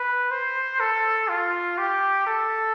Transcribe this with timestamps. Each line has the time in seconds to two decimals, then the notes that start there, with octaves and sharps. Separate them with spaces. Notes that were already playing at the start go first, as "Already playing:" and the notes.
Already playing: B4
0.31 C5
0.80 A4
1.29 F4
1.78 G4
2.27 A4